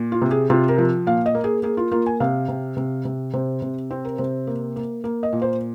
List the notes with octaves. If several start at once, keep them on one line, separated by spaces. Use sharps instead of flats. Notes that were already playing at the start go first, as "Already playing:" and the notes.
Already playing: A#2
F4
C3
G#4
C3 F4
A#4
F3
A#2 F5
D#5
A#3
G#4
A#3 G#4
F4
A#3 F4
G#5
C3 F5
C3
C3
C3
C3 C5
C3
C4 C5
A#4
C3 C5
A#3
A#3
A#3
D#5
A#2
C5